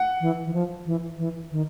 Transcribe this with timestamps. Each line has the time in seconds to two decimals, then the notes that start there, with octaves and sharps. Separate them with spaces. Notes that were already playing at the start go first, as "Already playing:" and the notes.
Already playing: F#5
0.21 E3
0.46 E3
0.54 F3
0.86 E3
1.18 E3
1.52 D#3